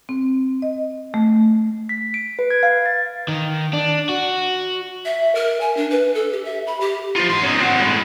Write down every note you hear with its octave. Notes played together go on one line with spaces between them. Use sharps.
C4
D#5
A3
B6
D7
B4
G#6
F5
A6
D#3
D4
F#4
E5
A#4
G#5
D4
B4
A4
G4
E5
B5
G4
F4 C5
G#2 C6
C#4 D#4
C4 F#4
A2 G#3